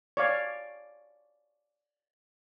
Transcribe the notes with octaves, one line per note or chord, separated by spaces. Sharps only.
C#5 D5 F5